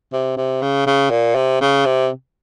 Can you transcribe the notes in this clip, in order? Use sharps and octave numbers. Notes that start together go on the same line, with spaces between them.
C3
C3
C#3
C#3
A#2
C3
C#3
C3